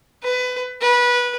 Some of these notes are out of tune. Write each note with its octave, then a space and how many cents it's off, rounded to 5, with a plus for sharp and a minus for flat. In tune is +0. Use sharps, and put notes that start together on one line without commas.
B4 +20
B4 -20